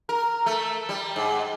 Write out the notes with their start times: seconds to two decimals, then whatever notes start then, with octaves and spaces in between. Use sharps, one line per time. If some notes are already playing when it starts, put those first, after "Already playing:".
0.09 A#4
0.46 A3
0.89 G3
1.16 G#2